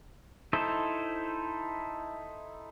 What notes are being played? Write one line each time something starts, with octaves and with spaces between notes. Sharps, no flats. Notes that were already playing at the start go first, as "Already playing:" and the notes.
D#4 E4 A4 C5